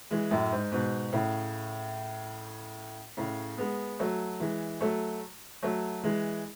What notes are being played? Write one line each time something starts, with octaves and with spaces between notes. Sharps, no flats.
E3 G#3
F#2 A2
G#2
G#2 B2
A2 C#3
A2 C#3
G#3 B3
F#3 A3
E3 G#3
F#3 A3
F#3 A3
E3 G#3